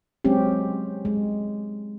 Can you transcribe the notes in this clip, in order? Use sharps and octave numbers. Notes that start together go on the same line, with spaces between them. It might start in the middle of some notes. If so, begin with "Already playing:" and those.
F#3 G#3 C4 C#4 G4
G#3